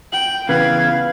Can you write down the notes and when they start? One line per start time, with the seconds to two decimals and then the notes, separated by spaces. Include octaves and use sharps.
0.12 G5 F#7
0.49 C#3 E3 B3 B4 F5 G#6